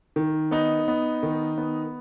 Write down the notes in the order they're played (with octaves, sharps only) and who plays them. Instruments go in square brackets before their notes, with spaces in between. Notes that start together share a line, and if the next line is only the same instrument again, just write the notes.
[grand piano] D#3
B3 D#4
B3
D#3
B3